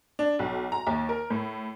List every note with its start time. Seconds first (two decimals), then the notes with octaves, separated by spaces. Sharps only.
0.19 D4
0.39 B1
0.72 A#5
0.87 D#2
1.09 A#4
1.30 A2